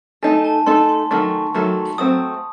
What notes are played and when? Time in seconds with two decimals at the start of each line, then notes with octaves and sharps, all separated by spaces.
0.23 A3 D#4 A4 G#5
0.44 A5
0.66 A3 D#4 A4 C6
0.89 C6
1.11 D#3 F#3 A3 C#6
1.54 D#3 F#3 A3
1.98 F#3 A3 C4 D#6